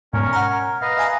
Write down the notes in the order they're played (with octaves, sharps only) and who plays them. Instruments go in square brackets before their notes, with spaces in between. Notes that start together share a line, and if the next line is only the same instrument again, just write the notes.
[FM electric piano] G#2 B2 [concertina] C#4 A#4 C#5
[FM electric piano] F#5 A#5
[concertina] B4 D#5 F5
[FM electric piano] E5 G#5 A#5